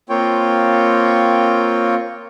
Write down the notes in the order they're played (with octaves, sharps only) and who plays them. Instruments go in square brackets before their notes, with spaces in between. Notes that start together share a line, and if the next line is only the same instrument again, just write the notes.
[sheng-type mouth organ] A#3 C4 F4 C#5 G5